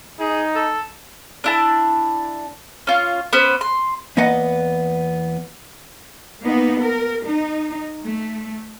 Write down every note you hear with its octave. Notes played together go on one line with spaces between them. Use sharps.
D#4 G#4
A4
D4 E4 A5
C#4 F4
B3 C#4 B4 C5
C6
E2 A#3 B3 B4 D#5 F#5
A#3 B3 D#4
A#4
D#4
A3